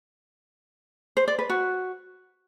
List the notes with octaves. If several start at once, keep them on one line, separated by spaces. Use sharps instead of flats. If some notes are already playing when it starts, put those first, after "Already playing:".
C5
D5
B4
F#4